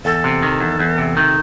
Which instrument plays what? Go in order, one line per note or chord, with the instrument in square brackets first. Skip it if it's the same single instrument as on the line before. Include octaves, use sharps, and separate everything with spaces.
[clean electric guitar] E2 [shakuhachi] A4
[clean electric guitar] C3
D#3
E2
E2
C3
D#3